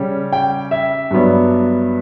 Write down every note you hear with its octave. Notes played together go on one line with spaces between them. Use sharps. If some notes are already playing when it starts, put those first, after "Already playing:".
Already playing: C#3 G3 C#4
G5
E5
G2 F#3 B3 D4